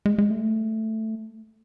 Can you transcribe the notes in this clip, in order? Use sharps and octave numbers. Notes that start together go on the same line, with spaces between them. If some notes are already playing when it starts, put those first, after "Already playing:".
G#3
G#3
A3